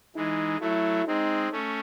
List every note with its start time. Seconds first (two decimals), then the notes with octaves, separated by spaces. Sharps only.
0.16 E3 G#3 D#4
0.61 F#3 A3 E4
1.07 G#3 C4 D#4
1.52 A3 C#4